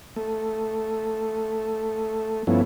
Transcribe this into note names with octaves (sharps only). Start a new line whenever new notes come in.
A3
G2 F3 A3 B3 C#4 E4